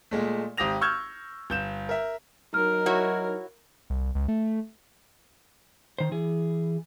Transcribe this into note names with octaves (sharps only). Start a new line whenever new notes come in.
A#2 G#3 A3
G#1 G4 D#6 A#6 F7
C#6 E6 F6 G6 G#6
G1 G6 E7
A#4 E5
F#3 D#4 A#4 F6
E4 F#4 C#5
C2
C#2
A3
D#3 C5
E3 G#4